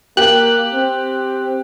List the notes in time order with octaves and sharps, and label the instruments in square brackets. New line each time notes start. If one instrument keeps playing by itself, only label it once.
[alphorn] A#3 [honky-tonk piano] G4 [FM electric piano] F#6
[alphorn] C4